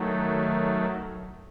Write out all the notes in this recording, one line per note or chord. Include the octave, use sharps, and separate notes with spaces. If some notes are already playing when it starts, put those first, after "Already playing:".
Already playing: D#3 F#3 A3